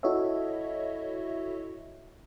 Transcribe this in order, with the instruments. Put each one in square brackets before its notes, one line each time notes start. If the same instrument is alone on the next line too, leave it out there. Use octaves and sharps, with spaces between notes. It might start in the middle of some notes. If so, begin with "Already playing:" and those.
[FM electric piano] E4 F#4 A4 C#5 D#5 E5